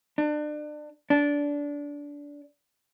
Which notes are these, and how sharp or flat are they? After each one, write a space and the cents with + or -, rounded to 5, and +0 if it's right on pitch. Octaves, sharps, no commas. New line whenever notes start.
D4 +30
D4 -20